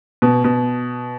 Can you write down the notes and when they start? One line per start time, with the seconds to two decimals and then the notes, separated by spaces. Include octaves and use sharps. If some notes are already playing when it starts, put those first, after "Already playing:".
0.22 B2
0.44 B2